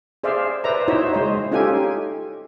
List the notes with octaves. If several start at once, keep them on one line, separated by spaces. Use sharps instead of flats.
G#4 C5 D5 E5 F5
B4 C5 D5 E5 A#5
D#4 E4 F#4 C5 C#5 E5
G#3 C5 D#5
C#4 D#4 F4 G4 A4 G#5